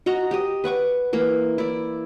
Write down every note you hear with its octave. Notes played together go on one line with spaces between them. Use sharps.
F#4 D#5 F#5 A#5
G4 D#5
B4 F#5 C#6 D6
E3 A#3
E4 D5